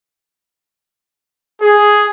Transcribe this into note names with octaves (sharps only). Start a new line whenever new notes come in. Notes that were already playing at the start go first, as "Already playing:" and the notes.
G#4